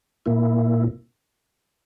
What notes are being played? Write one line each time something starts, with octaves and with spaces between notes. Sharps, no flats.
A#2 A#3 E4